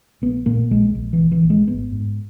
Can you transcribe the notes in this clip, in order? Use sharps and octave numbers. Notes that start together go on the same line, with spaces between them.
A#1 B3
A#2 A#3
A#1 G#3
A#1
E3
A#1
E3
A#1
G#3
G#1 B3
G#2